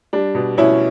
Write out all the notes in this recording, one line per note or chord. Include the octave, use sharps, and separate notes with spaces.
G3 D4
B2
B2 C#4 E4